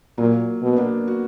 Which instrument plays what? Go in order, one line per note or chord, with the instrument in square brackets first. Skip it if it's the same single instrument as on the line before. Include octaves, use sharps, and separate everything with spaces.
[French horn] A#2 [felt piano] F#3 A#3
[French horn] B2
[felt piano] B3
A#3 D4
F#4